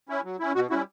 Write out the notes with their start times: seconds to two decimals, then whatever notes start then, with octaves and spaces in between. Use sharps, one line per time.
0.09 C#4 E4
0.24 F#3
0.39 C#4 E4
0.55 B2 F#4
0.70 G3 C#4 E4 F#4